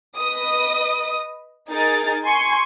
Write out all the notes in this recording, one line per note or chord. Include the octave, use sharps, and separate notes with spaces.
B4 D#5 D#6
D#4 G#4 A#4 A6
G#5 C6 C#6